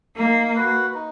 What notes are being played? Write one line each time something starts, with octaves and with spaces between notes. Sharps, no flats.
A#3 D#4
F#4 B4
D#4